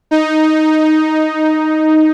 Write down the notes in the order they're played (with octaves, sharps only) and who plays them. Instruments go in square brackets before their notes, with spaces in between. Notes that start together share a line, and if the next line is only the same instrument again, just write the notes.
[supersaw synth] D#4